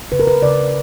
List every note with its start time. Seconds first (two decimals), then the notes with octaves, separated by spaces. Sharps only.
0.12 C#3 B4
0.20 A#4
0.27 B4
0.42 C#3 D5